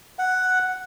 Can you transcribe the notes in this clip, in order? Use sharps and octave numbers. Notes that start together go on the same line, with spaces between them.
F#5